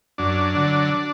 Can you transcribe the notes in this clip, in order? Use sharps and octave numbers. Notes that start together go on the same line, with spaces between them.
F#2 D4
D3 F#3